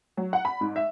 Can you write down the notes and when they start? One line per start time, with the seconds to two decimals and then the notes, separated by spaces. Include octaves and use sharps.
0.17 F#3
0.33 F#5
0.45 B5
0.61 G#2
0.76 E5